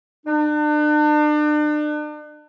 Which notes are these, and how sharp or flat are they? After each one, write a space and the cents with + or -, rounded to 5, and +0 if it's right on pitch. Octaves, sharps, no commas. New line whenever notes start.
D4 +40